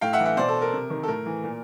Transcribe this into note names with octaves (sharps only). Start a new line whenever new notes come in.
A2 F5 G5
E5 F#5
E3
E5 F#5
B2 C5 D5
A4
A#4
C3
D#3
A4
A2 A#4
E3
A#2